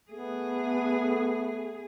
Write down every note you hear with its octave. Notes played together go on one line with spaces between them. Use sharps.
A3 B3 G#4